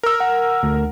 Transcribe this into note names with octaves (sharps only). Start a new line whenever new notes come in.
A#4 E6
F#5
D2